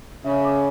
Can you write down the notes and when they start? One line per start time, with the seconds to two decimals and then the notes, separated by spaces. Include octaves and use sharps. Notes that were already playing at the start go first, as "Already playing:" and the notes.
0.24 C#3 E5
0.45 D6